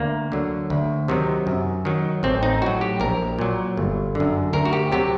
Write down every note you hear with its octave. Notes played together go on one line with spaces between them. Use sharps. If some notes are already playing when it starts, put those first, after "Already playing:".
Already playing: D2 A#3
D3 F#3
D2
C3 D#3 F#3
F#2
D#3 F#3
A1 C4
D#4
A2 F#3 F#4
G4
A#1 A#4
A#2 F#3
G1
D3
F#2
D2 A#4
F#4
G4
C3 F#3 G4